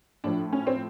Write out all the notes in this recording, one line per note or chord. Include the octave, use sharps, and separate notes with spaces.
A2 F3 D4
C#4
C4